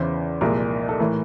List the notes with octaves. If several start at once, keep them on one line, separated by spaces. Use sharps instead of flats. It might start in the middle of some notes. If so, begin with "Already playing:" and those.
Already playing: E2 C#3 E3 C5
C2 A#2 F3 G#3 A#4
A4
A2 E3 A#4